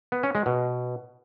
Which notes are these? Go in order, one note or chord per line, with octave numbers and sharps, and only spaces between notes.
B3
C#4
G#3
B2